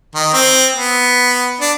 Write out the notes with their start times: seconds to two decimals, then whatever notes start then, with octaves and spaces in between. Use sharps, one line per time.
0.15 D#3
0.33 C4
0.76 B3
1.61 D4